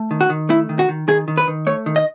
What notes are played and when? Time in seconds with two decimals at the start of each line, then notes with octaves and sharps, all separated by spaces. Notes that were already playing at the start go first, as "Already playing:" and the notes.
Already playing: A3
0.11 D#3
0.21 F#4
0.30 D#3
0.49 A3 E4
0.69 D#3
0.79 F#4
0.89 D#3
1.08 D#3 G#4
1.28 D#3
1.37 B4
1.48 D#3
1.67 A3 C#5
1.86 D#3
1.96 D#5